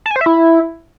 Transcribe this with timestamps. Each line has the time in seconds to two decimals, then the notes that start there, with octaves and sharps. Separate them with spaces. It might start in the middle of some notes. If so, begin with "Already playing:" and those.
0.06 A5
0.11 G#5
0.16 C5
0.21 E5
0.26 E4